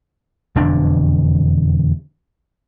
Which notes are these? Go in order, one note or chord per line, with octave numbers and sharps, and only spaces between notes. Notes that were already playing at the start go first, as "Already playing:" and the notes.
E1 F2 D3 D4